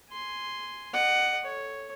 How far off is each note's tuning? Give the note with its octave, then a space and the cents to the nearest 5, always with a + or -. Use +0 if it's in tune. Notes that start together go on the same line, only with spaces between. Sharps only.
G#5 +0 C6 -5
D#5 -40 F#5 +10
A4 +0 C#5 +0